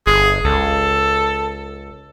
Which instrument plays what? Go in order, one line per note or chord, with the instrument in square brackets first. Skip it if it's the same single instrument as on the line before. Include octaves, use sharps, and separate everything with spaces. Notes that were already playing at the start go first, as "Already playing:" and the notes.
[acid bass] G1 [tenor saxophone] G#4
[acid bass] C#2 [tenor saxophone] A4